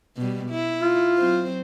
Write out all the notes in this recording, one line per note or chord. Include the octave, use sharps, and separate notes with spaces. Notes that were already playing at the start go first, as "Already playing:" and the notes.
B2 G3
E4
F4
F#3 C4 C5